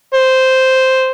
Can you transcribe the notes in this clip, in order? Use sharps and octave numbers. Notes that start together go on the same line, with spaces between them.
C5